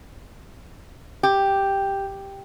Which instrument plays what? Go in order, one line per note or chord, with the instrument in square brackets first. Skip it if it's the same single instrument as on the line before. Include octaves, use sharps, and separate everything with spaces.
[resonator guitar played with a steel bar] G4